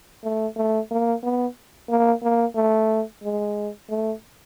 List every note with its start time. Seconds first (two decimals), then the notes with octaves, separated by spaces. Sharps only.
0.24 A3
0.57 A3
0.91 A#3
1.23 B3
1.89 A#3
2.23 A#3
2.56 A3
3.23 G#3
3.89 A3